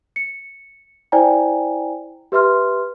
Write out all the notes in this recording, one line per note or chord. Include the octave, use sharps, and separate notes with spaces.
C#7
E4 C5 D5 G5 G#5 A#5
G4 B4 E5 C6 F6